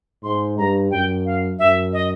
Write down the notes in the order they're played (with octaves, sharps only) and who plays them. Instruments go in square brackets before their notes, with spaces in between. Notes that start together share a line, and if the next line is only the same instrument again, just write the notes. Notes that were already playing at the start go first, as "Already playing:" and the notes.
[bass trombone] G#2 [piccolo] C6
[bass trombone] G2 [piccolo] A#5
[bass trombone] F#2 [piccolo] G5
[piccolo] F5
[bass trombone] F#2 [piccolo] E5
[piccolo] D#5